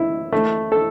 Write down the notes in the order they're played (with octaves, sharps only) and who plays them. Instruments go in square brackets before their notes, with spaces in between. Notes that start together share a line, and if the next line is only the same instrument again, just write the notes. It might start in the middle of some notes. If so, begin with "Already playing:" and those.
Already playing: [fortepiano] E4
A3
A4